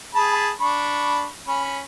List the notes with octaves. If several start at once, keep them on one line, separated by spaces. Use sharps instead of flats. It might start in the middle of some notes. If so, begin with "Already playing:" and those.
G#4 A5 B5
D4 B5 C#6
C#4 B5